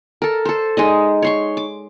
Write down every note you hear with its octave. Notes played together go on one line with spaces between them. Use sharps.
A4 A#4
A4 C5
G#3 D#4 D#5
C#5 C6 C#6
D6